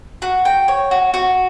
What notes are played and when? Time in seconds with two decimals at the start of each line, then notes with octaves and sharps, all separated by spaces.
0.22 F#4
0.45 G5
0.68 C#5
0.91 F#4
1.14 F#4